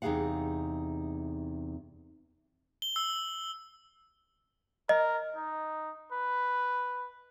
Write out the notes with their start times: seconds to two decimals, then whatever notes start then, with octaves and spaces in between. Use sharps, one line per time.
0.02 E2 C3 D#4 G#4 F5 F#5
2.82 G7
2.96 E6
4.89 A#4 D#5
5.35 D#4
6.12 B4